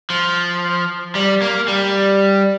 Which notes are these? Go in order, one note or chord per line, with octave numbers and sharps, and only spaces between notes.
F3
G3
A#3
G3